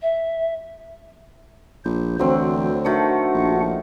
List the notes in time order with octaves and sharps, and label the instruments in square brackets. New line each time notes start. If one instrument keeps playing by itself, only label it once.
[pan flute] E5
[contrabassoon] A#1 [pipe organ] C5
[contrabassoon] D2 [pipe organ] E3 [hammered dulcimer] F#3 C4
[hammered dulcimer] D3 D#3 A3 [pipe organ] D4 F#4 F#5
[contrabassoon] A#1